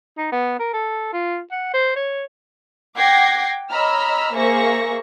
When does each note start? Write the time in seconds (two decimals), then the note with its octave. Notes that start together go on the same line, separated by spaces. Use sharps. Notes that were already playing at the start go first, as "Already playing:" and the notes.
0.17 D#4
0.32 B3
0.59 A#4
0.73 A4
1.13 F4
1.51 F#5
1.74 C5
1.96 C#5
2.96 F#5 G5 D6 G#6 A#6 C7
3.70 C#5 D#5 A#5 B5 E6 F6
4.34 A#3 G#4 C5 E5 C#6 A#6